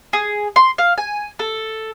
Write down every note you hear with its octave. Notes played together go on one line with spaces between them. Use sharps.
G#4
C6
F5
G#5
A4